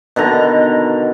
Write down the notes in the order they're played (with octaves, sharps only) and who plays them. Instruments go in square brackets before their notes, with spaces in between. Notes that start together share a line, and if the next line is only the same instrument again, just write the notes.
[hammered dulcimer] B2 D3 D#3 A#5